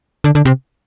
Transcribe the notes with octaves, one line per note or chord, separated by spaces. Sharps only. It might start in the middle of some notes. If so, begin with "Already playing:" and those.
D3
D3
C3